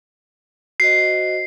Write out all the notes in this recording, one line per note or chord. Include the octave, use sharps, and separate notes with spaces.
F#4 C5 D#5 C7